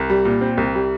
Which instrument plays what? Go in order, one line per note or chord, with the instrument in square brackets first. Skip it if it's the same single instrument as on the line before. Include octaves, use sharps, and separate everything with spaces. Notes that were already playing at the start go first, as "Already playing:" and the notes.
Already playing: [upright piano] C2
G3
A#2
C4
C2
G3